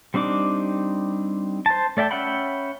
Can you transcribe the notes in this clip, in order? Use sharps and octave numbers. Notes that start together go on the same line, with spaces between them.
G3 C4 D4 D#4 D6
C5 A5
A3 D5 E5 G5 A5
C#4 E5 F#5 G5 B5